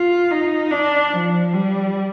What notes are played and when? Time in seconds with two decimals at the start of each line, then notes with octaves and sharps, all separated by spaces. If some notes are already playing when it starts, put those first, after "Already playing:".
Already playing: F4
0.31 D#4
0.72 D4
1.12 F3
1.54 G3